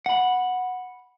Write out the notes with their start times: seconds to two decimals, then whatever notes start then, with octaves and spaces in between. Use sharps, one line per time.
0.06 F#5 B5